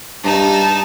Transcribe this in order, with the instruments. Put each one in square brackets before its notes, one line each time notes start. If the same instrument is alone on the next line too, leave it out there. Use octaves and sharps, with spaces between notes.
[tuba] G2 [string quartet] D#4 A5